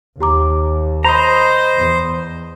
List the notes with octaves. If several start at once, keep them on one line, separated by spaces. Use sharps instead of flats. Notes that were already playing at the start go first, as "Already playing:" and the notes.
D#2 G4 A#5 D6
C5 D#5 A#5 B5
E2